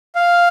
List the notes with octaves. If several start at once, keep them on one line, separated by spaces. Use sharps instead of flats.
F5